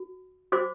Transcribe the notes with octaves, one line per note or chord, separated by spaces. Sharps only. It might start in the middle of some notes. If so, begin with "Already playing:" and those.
Already playing: F#4
F#4 C5 D6